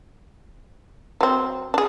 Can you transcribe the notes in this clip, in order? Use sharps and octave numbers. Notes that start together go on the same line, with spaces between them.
F#3 C4
D4 G#4